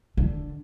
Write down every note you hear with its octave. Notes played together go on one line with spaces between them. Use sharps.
D3